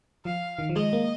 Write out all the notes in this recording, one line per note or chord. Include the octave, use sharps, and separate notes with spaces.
F3 F5
D#3
F3
G#3 D#5
A#3